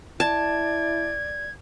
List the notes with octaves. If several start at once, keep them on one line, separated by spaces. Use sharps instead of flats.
E4 D5 A5 G#6